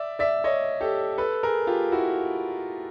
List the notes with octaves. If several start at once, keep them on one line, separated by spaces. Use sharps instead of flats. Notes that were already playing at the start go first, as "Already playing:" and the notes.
Already playing: D5 E5
D5 E5
C#5 D#5
G4 A4
A4 B4
G#4 A#4
F4 G4
E4 F#4